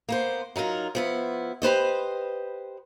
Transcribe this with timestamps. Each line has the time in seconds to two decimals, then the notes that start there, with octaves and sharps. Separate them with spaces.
0.09 A#3 B3 C5
0.56 F#3 D#4 F4 A#4
0.95 F3 B3 E4
1.62 G4 B4 C5 D#5